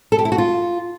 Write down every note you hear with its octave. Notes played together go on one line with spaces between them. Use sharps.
A4
G4
E4
F#4
F4